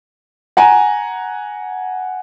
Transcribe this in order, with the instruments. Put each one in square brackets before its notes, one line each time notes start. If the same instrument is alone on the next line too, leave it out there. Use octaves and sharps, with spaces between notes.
[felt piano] F#5 G#5 A#5